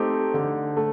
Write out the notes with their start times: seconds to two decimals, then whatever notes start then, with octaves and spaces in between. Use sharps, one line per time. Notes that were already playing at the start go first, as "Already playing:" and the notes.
Already playing: A3 C4 D#4 G4
0.34 D3
0.77 A3